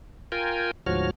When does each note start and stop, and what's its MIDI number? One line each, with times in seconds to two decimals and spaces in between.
0.32 0.71 65
0.32 0.71 70
0.32 0.71 79
0.32 0.71 80
0.86 1.11 38
0.86 1.11 44
0.86 1.11 53
0.86 1.11 66
0.86 1.11 73
0.86 1.11 89